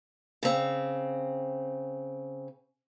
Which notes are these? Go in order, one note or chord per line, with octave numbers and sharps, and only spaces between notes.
C#3 C4